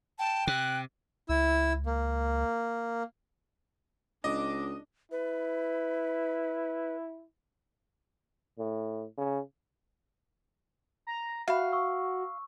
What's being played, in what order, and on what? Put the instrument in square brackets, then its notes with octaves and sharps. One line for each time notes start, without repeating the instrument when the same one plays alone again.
[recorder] G5 [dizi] A5
[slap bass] C3 [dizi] F#6
[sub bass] C#2 [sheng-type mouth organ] E4 E6
[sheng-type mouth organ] A#3
[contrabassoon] C#2 [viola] D4 [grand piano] D#5 [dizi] D6
[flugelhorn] E4 [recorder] B4
[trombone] A2
C#3
[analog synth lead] A#5
[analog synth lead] F#4 [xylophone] E5 B5 [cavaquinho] F5
[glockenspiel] C#6 E6